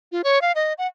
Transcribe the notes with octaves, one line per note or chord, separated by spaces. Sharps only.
F4
C#5
F5
D#5
F#5